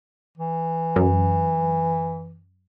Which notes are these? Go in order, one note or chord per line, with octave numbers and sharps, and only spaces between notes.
E3
F#2